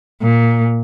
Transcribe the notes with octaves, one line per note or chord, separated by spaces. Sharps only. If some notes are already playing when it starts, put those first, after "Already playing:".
A#2